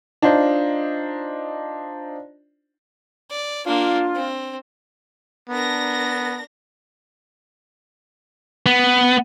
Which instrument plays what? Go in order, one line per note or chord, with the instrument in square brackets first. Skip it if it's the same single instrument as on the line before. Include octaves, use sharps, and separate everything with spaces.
[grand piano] D4 D#4 F4 C5
[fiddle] D5
[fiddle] A#3 D4 [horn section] F4
[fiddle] C4
[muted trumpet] B3 [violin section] D4 A#4 A#6
[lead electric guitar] B3